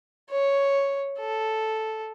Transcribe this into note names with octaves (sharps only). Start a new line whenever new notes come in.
C#5
A4